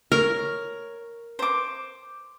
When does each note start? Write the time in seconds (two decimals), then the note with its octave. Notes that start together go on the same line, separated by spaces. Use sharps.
0.12 A#4 C#5
1.39 C5 D6